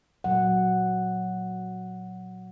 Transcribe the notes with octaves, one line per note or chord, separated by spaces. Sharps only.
A#2 F#3 F#5